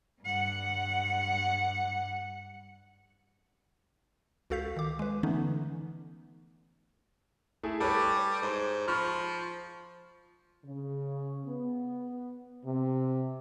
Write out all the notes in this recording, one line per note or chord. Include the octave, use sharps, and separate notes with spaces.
G2 F#5
C#2 F#4 A4 F5 G6 B6
D#3 D6
G#3 B4
D3 E3 A3 B3 C#4 D#4
A3 E4 G#4
G3 A4 B4 C#5
G#2
F3 B5 C#6 F6
C#3
B3
C3